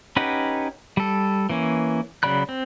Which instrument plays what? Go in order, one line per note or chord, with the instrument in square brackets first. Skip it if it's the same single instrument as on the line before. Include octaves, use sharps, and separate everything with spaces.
[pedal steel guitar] C#4 D#4 G4 B4 F#5
G3 A4
E3 A#3 C#4
C#3 F#3 D5 B5 F#6
C4